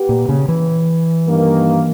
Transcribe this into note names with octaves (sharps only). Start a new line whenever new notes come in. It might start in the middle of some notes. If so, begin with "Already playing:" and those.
Already playing: B3 G4
A#2
C#3
E3
G2 D#3 A#3